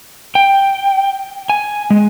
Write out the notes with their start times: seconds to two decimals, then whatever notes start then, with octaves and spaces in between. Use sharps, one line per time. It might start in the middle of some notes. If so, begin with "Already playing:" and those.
0.35 G5
1.50 G#5
1.90 G#3